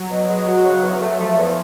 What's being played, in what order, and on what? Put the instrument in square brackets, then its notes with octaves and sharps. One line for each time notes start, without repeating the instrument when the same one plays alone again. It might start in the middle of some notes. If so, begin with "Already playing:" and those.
Already playing: [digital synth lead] F#3
[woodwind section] B2
G#3
F#4
C#3
E2
A3
[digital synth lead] F3 [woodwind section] A3
[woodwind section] E2